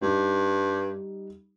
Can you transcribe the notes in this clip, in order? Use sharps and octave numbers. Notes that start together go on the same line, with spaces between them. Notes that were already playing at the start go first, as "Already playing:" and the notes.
G2 G3 D#4